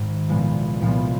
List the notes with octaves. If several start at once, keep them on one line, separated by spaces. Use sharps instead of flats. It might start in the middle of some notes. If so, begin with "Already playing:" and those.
Already playing: G#1 G#2 D#3
C2 A#2 F3 G#3 B3
C2 A#2 F3 G#3 B3